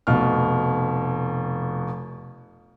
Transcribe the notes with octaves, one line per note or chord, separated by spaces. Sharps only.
F1 B2 F6